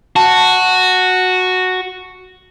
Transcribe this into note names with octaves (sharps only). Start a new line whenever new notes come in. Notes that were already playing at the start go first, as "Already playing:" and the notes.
F#4 A5